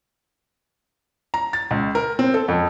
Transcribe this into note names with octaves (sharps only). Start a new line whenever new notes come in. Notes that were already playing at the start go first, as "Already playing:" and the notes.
A#5
A6
C#2
A#4
C4
A4
F2